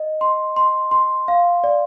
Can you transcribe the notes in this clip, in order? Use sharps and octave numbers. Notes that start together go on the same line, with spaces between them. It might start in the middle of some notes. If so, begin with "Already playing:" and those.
Already playing: D#5
C6
C6
C6
F5
D5